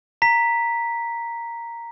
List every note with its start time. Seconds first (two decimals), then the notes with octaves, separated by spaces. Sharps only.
0.22 A#5 B6